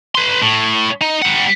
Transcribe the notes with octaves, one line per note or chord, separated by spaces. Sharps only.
B4 C6
A2
D#4
G3 F#5